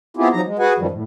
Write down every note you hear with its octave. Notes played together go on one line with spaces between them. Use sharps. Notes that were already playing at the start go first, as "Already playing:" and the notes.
B3 C4 E4 F4 G4 G#4
F3 F#3 D#4 A#5
G#3
F#4 G#4 B4 F#5 G#5
F#2 D#3 F3 G3
A2